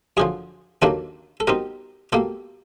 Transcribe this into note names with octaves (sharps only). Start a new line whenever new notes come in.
F#2 D3 F3 G#4
D#2 D#3 F#3 A#3 D4 A4
A4
B2 G3 C4 D#4 A#4
B2 G3 A#3 A4